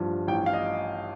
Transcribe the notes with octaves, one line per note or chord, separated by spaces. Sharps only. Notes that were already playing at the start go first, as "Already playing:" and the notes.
Already playing: A1 G2 F3
A1 G5
F5
D#5